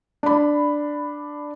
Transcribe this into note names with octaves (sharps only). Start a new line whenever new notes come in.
D4 B5